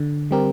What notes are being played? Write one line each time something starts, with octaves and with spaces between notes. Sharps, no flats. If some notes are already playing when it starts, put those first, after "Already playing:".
Already playing: D3
G3 C4 G4 A#4